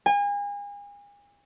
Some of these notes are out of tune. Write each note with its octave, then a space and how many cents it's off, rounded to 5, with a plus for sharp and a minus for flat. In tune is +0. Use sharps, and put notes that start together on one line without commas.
G#5 -35